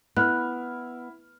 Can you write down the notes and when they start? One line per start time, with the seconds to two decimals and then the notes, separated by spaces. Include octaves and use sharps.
0.17 B3 E4 F6 F#6